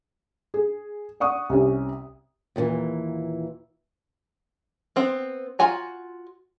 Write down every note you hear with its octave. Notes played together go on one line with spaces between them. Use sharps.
G#4
D5 F#5 C#6 D#6
C2 C3 C#4
D#2 A#2 D3 E3
B3 C4
F4 F#4 G#5 A#5